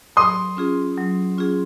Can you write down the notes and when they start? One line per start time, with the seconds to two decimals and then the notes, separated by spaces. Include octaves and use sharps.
0.16 F#3 C6 D#6
0.57 C#4 F4 G#4
0.97 F#3
1.38 C#4 F4 G#4